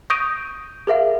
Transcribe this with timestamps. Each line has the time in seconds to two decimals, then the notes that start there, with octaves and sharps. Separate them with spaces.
0.10 C#6 D#6 G6 A#6 D7 D#7
0.87 G#4 A#4 E5 F5